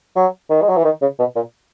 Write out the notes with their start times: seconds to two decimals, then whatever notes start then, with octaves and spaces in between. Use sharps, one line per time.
0.16 F#3
0.50 D#3
0.62 G#3
0.69 F#3
0.77 E3
0.85 D#3
1.02 C#3
1.19 B2
1.36 A#2